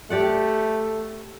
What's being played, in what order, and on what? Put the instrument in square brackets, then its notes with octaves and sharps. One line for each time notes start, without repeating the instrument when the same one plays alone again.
[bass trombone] A3 [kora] G4 D5 F#5